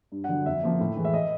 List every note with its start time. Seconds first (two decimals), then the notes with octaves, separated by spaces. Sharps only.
0.12 G2
0.24 F#5
0.29 D3 F#3
0.46 F2 E5
0.63 C#3 F3 A#3
0.80 A2
0.96 E3 G#3
1.05 E5
1.14 D#5